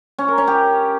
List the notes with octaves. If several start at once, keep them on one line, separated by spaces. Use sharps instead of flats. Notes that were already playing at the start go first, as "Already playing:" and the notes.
C#4
A#4
C#4
G4